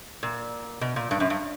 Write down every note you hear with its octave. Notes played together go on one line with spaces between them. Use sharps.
A#2
B2
A#2
G2
F#2
G2